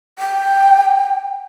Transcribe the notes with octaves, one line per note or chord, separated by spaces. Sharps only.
G5